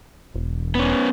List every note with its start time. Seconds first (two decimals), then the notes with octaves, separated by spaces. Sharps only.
0.34 E1
0.75 B3 C#4